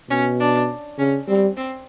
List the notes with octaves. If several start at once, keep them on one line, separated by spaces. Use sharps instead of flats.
B2 C#4
D4
C#3 C#4
G3 C4
C4